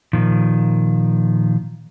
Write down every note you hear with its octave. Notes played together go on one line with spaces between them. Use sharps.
A#2 D#3 F3